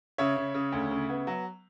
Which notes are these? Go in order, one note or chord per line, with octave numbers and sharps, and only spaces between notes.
C#3 C#5 E5
C#3
C#3
D2
C#3
B3
F#3